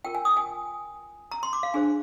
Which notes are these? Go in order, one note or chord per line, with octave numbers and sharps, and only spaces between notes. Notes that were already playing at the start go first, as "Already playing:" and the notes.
F4 A#4 G5
G#5
D#6
G#5
A#5
C6
D6
F5
D4 G#4 C5 G#5